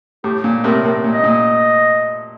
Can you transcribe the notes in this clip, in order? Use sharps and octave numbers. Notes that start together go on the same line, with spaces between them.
A2 G4
A#2
A2 C3 A#4
A2 A#4
A#2
D#5
A#2